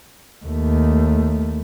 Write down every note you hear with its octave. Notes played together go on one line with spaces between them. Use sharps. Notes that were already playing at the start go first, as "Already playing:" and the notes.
D#2 A3